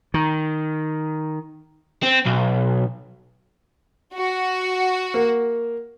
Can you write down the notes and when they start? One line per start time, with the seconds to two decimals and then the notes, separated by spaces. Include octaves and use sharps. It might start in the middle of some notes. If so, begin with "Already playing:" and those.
0.14 D#3
2.03 C4
2.26 B1
4.15 F#4
5.14 A#3